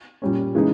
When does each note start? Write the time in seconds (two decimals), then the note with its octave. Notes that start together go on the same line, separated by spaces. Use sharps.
0.22 A#2 G3 C#4
0.55 C#3 E3 G#3 D#4